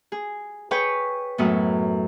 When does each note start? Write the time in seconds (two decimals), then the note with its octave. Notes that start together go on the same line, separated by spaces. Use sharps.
0.12 G#4
0.71 G#4 B4 C#5 G5 C#6
1.38 F#2 A2 B3